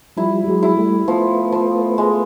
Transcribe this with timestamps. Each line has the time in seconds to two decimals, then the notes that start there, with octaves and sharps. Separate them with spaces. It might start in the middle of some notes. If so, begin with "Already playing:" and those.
0.17 F3 G3 E4
0.47 F#3 G#3
0.63 E4
0.77 G3 A3
1.08 F3 A3 B3
1.52 F3
1.98 G#3